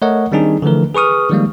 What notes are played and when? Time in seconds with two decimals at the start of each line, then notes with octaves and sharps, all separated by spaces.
0.02 A3 A#4 C#5 D#5 F#5
0.32 D#3 G3 C4 D4 D#4 G#4
0.62 D3 E3 F3 A3 A#4
0.94 G#4 B4 C#6 D#6 F6
1.30 D#3 F3 G3 G#3 A#3